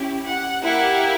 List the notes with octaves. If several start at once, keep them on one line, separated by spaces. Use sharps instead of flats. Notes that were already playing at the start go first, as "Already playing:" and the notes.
Already playing: C#4 E4 G4
F#5
A#3 E4 G4 F#5